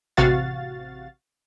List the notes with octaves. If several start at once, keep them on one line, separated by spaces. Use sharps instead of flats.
A1 C3 F#4 F5 A6